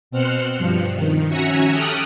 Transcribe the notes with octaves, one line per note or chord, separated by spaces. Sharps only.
B2 C4 C5 F6 F#6 C#7
G2 F3
D#3
C#4 F#4 E5 F#5 G#5 A#5
G4 A4 G5 D#6 F6 F#6